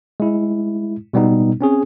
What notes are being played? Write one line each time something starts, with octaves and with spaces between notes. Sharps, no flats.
G#3 E4
B2 G3 B3 D#4
C4 C#4 G#4